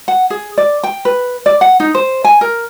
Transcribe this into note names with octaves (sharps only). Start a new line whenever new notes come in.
F#5
G#4
D5
G5
B4
D5
F#5
D#4
C5
G#5
A#4